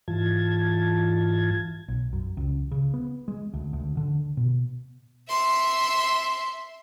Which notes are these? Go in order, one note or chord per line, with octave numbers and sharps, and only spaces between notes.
G#2 E3 F4 A5 G#6
B1
F#2
C#2
C#3
B3
G#3
D2
D2
D3
B2
E5 C6